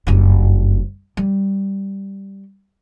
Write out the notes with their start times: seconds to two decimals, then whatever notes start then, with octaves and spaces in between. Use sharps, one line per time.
0.07 F#1 G2
1.17 G3